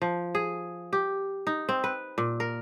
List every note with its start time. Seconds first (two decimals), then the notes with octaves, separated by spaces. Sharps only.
0.02 F3
0.35 G#4
0.93 G4
1.47 D#4
1.69 C4
1.84 B4
2.18 A#2
2.40 A#4